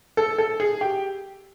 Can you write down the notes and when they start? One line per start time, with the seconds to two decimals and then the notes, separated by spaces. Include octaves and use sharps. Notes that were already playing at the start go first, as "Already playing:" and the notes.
0.17 A4
0.38 A4
0.60 G#4
0.81 G4